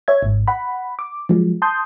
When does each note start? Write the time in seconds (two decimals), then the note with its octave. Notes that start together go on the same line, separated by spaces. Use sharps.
0.08 C#5 E5 G#6
0.23 G#1 G#2
0.48 F#5 B5
0.99 D6
1.29 F3 F#3 G#3
1.62 A5 C6 D#6 G6